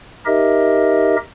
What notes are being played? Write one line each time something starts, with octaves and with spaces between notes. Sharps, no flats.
D#4 G4 A#4 D#5 E5